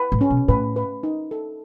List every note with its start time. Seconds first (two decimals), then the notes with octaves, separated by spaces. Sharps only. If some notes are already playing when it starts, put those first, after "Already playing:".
Already playing: B4
0.12 A2
0.21 C#4
0.30 B2
0.48 A2 B4
0.76 B4
1.03 D#4
1.31 A4